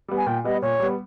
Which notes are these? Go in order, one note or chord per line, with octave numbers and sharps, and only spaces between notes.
G3 B3
G#5
A#2 G5
G3 B3 D#5
A#2 C#5
G3 B3